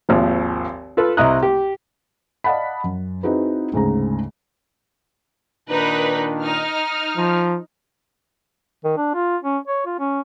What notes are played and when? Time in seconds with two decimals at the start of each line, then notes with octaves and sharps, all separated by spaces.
0.09 G#1 D#2 F3
0.97 F4 A4 B4
1.17 C2 E4 D#5 A#5 D#6 F#6
1.43 G4
2.44 D5 D#5 F5 F#5 A5 B5
2.84 F#2
3.23 C4 D#4 E4 F#4 G#4 B4
3.73 D2 G#2 C#3 A#5
5.69 A#2 D#3 D4 D#4 A#4 B4
6.43 D#4 F6
7.16 F3
8.84 D#3
8.97 D4
9.14 F4
9.43 C#4
9.67 C#5
9.86 F4
9.99 C#4